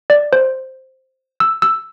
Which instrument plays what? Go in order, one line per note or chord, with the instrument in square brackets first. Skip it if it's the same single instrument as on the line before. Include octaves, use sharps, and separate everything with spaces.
[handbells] D5
C5
E6
E6